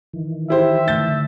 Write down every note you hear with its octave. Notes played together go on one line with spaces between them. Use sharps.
D#3 E3
E4 G4 C5 E5
D3 A3 G6 A6